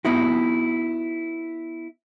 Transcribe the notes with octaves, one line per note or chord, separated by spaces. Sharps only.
B3 D#4 E4 F#4